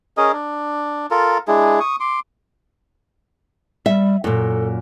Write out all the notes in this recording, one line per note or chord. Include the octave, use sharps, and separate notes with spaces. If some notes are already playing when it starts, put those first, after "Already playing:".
C#4 G#4 A#4 D#5
D4
F4 A4 A#4
G#3 D4 E4 G#4
C#6 D#6
C6 D6
G3 E5
F#2 A#2 A4